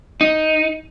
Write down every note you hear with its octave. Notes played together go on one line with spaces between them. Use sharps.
D#4